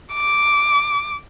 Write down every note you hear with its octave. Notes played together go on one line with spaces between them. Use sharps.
D6